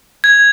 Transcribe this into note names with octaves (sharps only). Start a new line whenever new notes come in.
G#6